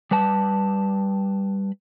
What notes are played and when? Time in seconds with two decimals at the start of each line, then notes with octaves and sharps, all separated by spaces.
0.11 G3 B4 A5